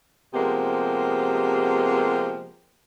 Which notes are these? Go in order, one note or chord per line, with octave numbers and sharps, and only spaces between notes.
C3 F3 G#3 A#3 B3 G4